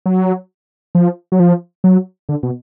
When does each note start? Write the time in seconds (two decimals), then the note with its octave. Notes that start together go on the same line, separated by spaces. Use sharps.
0.06 F#3
0.95 F3
1.32 F#3
1.40 F3
1.84 F#3
2.29 D3
2.43 B2